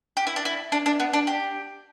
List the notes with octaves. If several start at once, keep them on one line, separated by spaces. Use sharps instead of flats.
G4
E4
D4
E4
D4
D4
B3
D4
G4